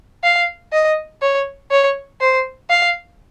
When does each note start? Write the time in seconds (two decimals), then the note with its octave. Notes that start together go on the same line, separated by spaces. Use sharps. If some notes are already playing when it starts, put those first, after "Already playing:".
0.24 F5
0.73 D#5
1.22 C#5
1.71 C#5
2.21 C5
2.70 F5